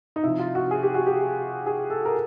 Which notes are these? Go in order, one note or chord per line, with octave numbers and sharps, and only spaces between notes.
D#4
C3 F3 E4
F4
F#4
G#4
G4
F#4
G4
G#4
A4
A#4